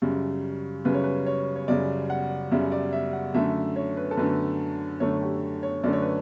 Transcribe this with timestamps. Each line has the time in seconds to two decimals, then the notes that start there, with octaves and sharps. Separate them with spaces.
0.02 F#2 C#3 G3
0.85 F#2 C#3 G3 B4
0.94 C#5
1.04 B4
1.26 C#5
1.56 C#5
1.68 F#2 C#3 G3 D5
2.10 F#5
2.51 F#2 C#3 G3 E5
2.72 D5
2.93 E5
3.13 F#5
3.34 F#2 D3 A3 E5
3.76 C#5
3.97 B4
4.11 A4
4.17 F#2 D3 A3 B4
5.00 F#2 D3 A3 C#5
5.21 G4
5.63 C#5
5.83 F#2 D3 A3 D5
5.93 C#5
6.02 B4